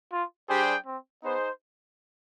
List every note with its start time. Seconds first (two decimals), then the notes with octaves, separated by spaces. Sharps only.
0.12 F4
0.49 G3 D4 G4 G#4 C5 G5
0.86 C4
1.23 B3 D#4 G#4 C5